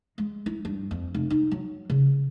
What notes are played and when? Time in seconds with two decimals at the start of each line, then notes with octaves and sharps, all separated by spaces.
0.18 G#3
0.46 E4
0.65 G2
0.91 F2
1.15 F1
1.30 D#4
1.51 F#3
1.90 C#3